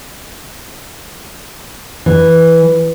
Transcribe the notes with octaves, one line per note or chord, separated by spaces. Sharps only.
E3